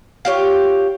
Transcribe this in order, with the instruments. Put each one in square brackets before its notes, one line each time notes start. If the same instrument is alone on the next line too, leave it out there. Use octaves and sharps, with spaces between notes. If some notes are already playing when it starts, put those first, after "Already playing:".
[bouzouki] F4 G4 C#5